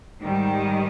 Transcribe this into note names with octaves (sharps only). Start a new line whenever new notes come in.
G#2 D#3 G3